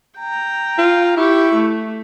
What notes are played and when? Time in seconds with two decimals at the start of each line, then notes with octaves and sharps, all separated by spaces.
0.18 G5 A#5
0.78 F4
1.17 E4 G4 C#6
1.53 A3